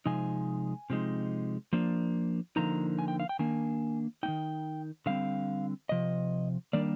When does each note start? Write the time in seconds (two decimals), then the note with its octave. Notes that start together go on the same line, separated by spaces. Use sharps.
0.06 C3 F3 G#3 D#4 G#5
0.90 C3 F3 G#3 D#4
1.73 F3 A#3 D4
2.56 D3 F3 A#3 D#4 A#5
2.99 G#5
3.08 G5
3.20 F5
3.29 G5
3.39 D#3 A#3 D4 G#5
4.23 A#3 D#4 G5
4.28 D#3
5.06 D3 G3 C4 F5
5.89 C3 F3 D#5
6.73 D#3 G3 A#3 D4 D5